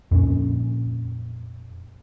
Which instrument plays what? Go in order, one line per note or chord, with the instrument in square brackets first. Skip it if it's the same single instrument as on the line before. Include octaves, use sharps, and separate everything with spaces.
[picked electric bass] F2 A#2 C#4